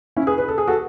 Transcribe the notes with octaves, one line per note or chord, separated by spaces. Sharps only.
C#4 E4
G#4 B4
B4
A4
G#4
F#4 A4